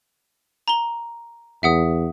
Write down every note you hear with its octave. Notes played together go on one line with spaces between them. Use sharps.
A#5 G7
E2 E5 F#5 D#6